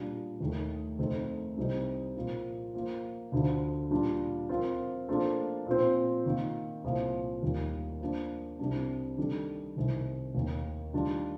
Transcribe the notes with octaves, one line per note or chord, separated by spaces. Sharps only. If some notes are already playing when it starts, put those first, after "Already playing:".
Already playing: A#2 G3 D4
D#2 D#3 A3
F2 D#3 A3 C4 D#4
C2 C3 G3 C4 D#4
A#2 F3 A#3
F3 A#3 F4
D2 D3 F3
A#2 G3 D4 F4
F3 C4 F4 A#4
F3 A#3 D4 F4 A4
A#2 F3 C4
D#3 A#3 F4
C2 A#2 F3 A#3 F4
D#2 D#3 G3 A#3
F3 A#3 D4
C2 C3 G3 D4
D#3 G3 D4 A4
C2 C3 D#3
D#2 D#3 A#3
D#3 G3 D4 F4